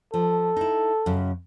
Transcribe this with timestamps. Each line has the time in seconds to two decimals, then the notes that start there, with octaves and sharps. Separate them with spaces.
0.14 F3 A4
0.56 D#4 E4
1.06 F#2 C#3